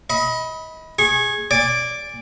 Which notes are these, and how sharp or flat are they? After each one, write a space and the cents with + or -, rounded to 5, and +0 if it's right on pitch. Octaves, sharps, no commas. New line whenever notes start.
D#5 +30 B5 -10
G#4 +0 C#6 -30
D5 +0 G#5 -25 D6 +0